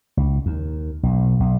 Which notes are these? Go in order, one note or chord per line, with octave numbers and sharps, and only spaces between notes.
C#2
D#2
B1
B1